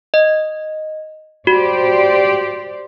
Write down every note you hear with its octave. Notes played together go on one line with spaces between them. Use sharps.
D#5
F#4 G4 C5 D5